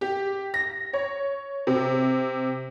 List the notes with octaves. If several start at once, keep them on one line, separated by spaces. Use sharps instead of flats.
G4
A#6
C#5
C3